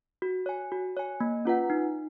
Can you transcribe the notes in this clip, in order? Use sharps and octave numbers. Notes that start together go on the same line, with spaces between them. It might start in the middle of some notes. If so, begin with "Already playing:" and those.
F#4
C#5 G#5
F#4
C#5 G#5
A#3
C#4 F4 B4 F#5
D#4